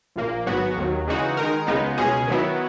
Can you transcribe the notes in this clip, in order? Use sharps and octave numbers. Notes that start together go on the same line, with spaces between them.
A#1 A#2 A#3
G#1 G#2 F#3 B3 F#4
D#2 D#3 F#3
C#3 E3 G#3 D#4 F#4
D#3 G#3 D#4 A#4
C#2 C#3 G#3 B3 D#4
C#2 B2 G#3 C#4 G#4
D#3 F#3 B3 E4